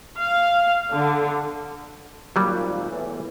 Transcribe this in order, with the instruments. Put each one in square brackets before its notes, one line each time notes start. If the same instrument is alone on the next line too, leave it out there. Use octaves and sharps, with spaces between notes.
[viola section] F5
D3
[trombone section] G#1 A#2 [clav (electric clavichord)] F#3 G3
[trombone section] E2 A2 E3